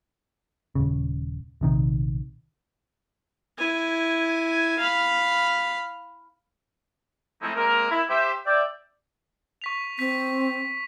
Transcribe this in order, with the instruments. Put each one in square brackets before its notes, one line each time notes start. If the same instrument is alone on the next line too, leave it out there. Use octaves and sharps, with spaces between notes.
[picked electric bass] D#1 C#3
A#1 C3 D#3
[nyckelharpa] E4 G#5
F5 B5
[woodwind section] F3 G#3 A3 C4 D#4 E4
G#3 A#3 C4 A#4
E4
G4 C5 E5
D5 E5 G5
[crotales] C#6 B6 F7
[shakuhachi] C4 [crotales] B6